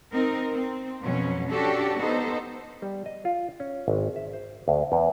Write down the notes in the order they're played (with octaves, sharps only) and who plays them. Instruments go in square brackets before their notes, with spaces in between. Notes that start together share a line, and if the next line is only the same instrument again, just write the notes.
[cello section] C4 D#4 A#4
C4
F2 B2 F#3 C#4
C#4 D4 F#4 G4 A4
B3 D#4 A4 C5
[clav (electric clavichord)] G3
D#5
F4
C#4
G#1
E5
C5
D2
E2